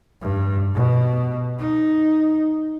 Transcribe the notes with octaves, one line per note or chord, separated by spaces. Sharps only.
G2
B2
D#4